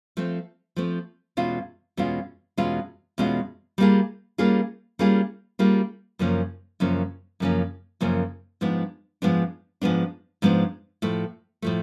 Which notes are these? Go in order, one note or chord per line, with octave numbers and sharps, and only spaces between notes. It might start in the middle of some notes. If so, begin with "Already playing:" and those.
F3 A3 C4
F3 A3 C4
E2 B2 G#3 C#4 F4
E2 B2 G#3 C#4 F4
E2 B2 G#3 C#4 F4
E2 B2 G#3 C#4 F4
G3 A#3 C#4 F4 G#4
G3 A#3 C#4 F4 G#4
G3 A#3 C#4 F4 G#4
G3 A#3 C#4 F4 G#4
F#2 C#3 F3 A#3 C#4
F#2 C#3 F3 A#3 C#4
F#2 C#3 F3 A#3 C#4
F#2 C#3 F3 A#3 C#4
G#2 F3 G#3 B3 D4
G#2 F3 G#3 B3 D4
G#2 F3 G#3 B3 D4
G#2 F3 G#3 B3 D4
A2 F3 A3
A2 F3 A3